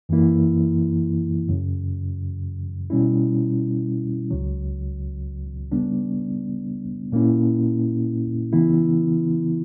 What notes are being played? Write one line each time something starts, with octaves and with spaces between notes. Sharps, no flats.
F#2 E3 A#3 E4
F#2 C#3 F#3
B2 G3 C#4 E4
C#2 C#3 F#3
C#3 G3 B3 D4
A#2 A#3 C#4 E4
C#3 E3 B3 E4